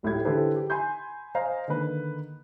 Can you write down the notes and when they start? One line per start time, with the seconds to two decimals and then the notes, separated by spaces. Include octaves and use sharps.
0.03 D1 A2 G4 G#6
0.25 D3 E3 G4 A4 B4 C5
0.56 G4
0.70 G#5 B5 C6 G6
1.35 C5 D#5 F5 G#5 A#5
1.68 D3 D#3 A#3 B4